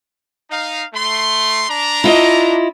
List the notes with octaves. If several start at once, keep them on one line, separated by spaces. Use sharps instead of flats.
D#4 F5
A3 C6
D4 A#5
E4 F4 D#5